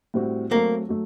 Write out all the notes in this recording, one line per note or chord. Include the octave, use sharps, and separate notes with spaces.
A2 G3 C4 F#4
F#3 A3 A#3 C4 F#4
F#3 A3